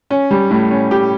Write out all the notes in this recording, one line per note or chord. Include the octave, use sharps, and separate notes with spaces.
C#4
G3
A2
C#4
G4